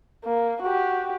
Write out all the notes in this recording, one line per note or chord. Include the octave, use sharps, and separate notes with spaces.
A#3
F#4 G4